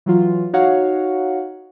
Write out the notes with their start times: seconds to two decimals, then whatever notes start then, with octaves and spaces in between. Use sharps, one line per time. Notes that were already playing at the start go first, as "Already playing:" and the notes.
0.06 E3 F#3 F4
0.53 D#4 F#4 C#5 F5 F#5